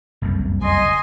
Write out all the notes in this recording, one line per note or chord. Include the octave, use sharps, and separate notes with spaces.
F#1 C2 F2
D#5 G#5 C6